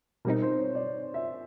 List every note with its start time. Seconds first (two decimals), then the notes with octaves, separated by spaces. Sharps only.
0.25 B2 G3 C4 D#4 A#4
0.42 C5
0.58 C#5
0.75 D5
1.14 E5